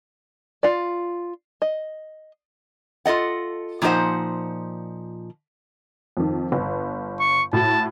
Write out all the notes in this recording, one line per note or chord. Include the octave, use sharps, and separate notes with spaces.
F4 D5
D#5
F4 A4 D#5 F#5
A#2 F3 D#4 E4 C5 F#5
F2 D#3
G1
C#6
A2 F#4 A5